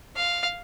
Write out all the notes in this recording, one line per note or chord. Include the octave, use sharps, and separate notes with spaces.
F5